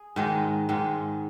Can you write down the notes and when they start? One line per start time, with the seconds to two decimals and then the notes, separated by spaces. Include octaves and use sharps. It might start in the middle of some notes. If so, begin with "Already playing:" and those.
Already playing: G#4
0.16 G#2 D#3 G#3 D#4
0.69 G#2 D#3 G#3